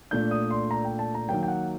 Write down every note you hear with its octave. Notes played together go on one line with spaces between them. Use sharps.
A#2 A3 D4 G6
D#6
C6
A#5
G5
A5
A#5
D#3 F#3 A#3 G5
G5
F#5